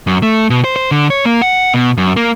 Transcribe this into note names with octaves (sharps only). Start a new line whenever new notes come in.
F#2
A3
B2
C5
C5
D3
C#5
A#3
F#5
B2
F#2
A#3